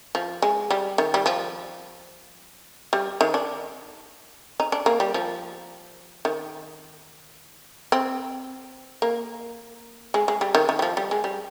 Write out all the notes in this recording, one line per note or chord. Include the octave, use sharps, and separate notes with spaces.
F3
G#3
G3
D#3
G3
F3
G3
D#3
D4
D#4
D4
A#3
G3
F3
D#3
C4
A#3
G#3
G#3
G3
D#3
D#3
G3
F3
G3
G#3
G3